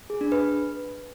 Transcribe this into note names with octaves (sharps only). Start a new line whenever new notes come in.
G#4
D4
B4